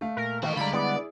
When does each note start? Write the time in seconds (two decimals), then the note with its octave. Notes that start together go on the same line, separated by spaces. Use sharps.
0.01 A3 F5
0.17 A#2 A#4
0.43 D#3 E3 F#4
0.57 D2 D3 G3 G#3 D5 F5 A#5 B5
0.73 B3 E4 G#4 D5